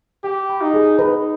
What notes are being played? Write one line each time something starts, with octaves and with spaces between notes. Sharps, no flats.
G4 G5
B5
D#4
G#4
D#4 B4